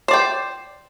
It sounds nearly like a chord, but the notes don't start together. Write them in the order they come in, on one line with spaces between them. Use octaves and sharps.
C5 D5 G5